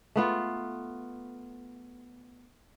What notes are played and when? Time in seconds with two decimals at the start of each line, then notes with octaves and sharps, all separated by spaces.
0.16 A3 B3 F4